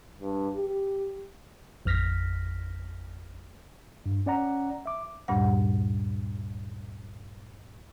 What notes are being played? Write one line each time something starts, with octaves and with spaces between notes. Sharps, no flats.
G2
G4
A1 F2 F6 A#6 B6
G2
C#4 D5 F#5 A#5
E5 D6
D2 G2 A#2 G3 F#5